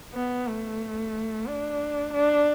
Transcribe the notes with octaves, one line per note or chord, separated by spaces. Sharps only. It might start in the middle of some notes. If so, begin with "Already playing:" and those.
B3
A3
D4
D4